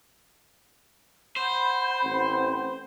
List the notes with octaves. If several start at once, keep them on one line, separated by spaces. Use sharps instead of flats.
C5 F#5 B5 G6
A1 C4